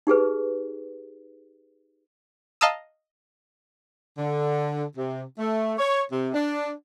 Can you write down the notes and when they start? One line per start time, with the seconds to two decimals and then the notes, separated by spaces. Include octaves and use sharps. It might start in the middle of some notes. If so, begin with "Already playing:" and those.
0.07 D#4 G4 G#4 B4
2.61 D#5 F5 A5 A#5 D#6 E6
4.18 D3
4.97 C3
5.39 A3
5.79 C#5
6.12 C3
6.34 D4